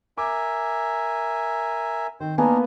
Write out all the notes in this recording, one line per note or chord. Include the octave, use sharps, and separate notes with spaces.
A#4 E5 G#5 D6
D#3 C4 C5
A#3 B3 D4 D#4 A#4 G#5